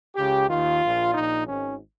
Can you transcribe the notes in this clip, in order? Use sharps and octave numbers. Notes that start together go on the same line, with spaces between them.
C#2 C#3 G4
D#2 D#3 F4
A#1 A#2
A#1 A#2 D#4
G#1 G#2 D#3 C#4